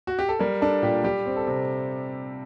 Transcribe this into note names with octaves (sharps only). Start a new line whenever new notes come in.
F#4
G4
A4
G3 A#4
D4 A4
A#2 G4
G3 G4
C4
A4
C3